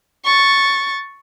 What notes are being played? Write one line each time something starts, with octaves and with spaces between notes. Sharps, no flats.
C#6 A6